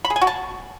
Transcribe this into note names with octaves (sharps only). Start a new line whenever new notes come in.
B5
G#4
G#5
F#4
A5